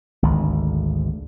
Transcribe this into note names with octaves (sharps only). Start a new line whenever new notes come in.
G#1 D2